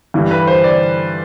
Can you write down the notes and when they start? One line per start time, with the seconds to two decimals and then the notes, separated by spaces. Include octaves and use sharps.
0.14 G2 E3 G3
0.31 B4
0.47 C5
0.64 D5